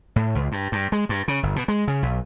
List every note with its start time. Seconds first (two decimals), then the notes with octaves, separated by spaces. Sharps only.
0.16 A2
0.35 C#2
0.52 G2
0.72 G2
0.92 G#3
1.09 G2
1.28 C#3
1.43 G1
1.56 B2
1.68 G#3
1.88 C#3
2.02 B1